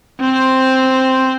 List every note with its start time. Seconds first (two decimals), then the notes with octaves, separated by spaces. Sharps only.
0.21 C4 C5